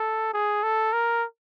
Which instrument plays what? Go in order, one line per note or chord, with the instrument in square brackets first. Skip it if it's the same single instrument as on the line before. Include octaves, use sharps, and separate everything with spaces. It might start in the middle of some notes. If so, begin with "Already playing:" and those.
Already playing: [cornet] A4
G#4
A4
A#4